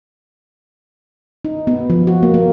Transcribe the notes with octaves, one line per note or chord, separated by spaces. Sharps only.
D#4
B3
F3
F#4
A#3
A#3